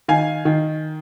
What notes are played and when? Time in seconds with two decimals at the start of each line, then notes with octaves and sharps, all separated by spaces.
0.08 D#3 F5 G#5
0.45 D#3